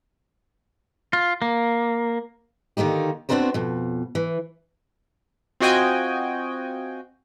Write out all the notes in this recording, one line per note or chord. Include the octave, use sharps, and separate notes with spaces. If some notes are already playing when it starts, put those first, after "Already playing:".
F4
A#3
D3 D#3 A#3 D#4 G4
B3 C4 D4 F#4 A#4 C5
F2 B2
E3
C4 F4 F#4 D#5 G5 G#5